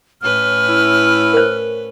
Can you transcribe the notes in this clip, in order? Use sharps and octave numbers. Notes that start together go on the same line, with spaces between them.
A2 C#4 B4 F6
E4
A#4 C5